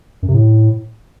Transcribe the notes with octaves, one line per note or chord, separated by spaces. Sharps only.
F#2
C3
A2